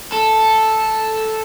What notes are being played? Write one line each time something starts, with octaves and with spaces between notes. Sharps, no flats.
A4